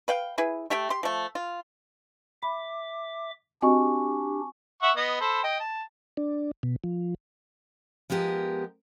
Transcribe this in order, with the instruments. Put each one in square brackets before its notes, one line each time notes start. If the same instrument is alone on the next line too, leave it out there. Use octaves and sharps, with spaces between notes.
[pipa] B4 F5 G5
E4 G#4 B4
A3 G4 E5 G5
G4 C6
F3 A3
F4
[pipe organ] E5 D6 [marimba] B5
[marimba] C4 F#4 D#5 [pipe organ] D4 G4 [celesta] G#5 C#6
[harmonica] E5 F#5 C#6
B3 D#5
A4 C5 B5
D#5 G5
A5
[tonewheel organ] D4
B2
F3
[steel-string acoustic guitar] F3 G#3 B3 G4 A#4